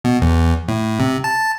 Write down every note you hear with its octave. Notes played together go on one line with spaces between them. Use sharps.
B2
E2
A2
C3
A5